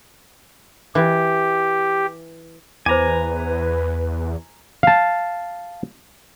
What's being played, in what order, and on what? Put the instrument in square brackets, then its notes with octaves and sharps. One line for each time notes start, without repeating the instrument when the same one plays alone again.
[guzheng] E3 [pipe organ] G4
[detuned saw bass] E2 [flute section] B4 [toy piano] C5 B5 D6 [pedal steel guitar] G#5 A#5
[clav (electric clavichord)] F5 A5